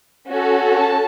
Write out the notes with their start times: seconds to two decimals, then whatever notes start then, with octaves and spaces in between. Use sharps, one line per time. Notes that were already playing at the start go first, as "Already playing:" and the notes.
0.28 C#4 F#4 A4
0.75 A5